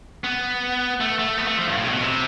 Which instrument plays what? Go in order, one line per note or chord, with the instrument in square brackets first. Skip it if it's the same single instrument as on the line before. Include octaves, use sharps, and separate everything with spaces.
[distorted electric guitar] B3
A3
A3
B3
A3
F3
G2
A2
C3
B2
C3